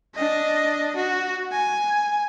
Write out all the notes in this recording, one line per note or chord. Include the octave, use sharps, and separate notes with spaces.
D4 D#5
F#4
G#5